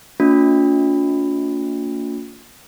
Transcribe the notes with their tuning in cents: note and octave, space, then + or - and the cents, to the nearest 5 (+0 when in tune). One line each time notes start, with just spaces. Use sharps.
A#3 -30 D4 -45 F4 +35